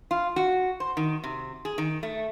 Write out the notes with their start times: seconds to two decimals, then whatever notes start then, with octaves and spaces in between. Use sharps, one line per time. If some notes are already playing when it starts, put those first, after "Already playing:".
0.11 F4
0.36 F#4
0.80 C5
0.97 D#3
1.24 C3
1.65 G#4
1.78 D#3
2.03 A3